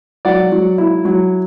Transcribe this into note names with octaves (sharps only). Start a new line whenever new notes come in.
F#3 D5 F#5
F#3
E4
F#3